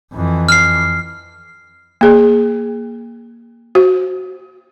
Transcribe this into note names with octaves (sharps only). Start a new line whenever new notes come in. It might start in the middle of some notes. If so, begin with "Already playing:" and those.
F2 E3
F6 C7
A#3 G#4
F#4